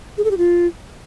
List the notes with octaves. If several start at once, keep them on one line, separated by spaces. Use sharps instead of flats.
G#4
A4
G4
F4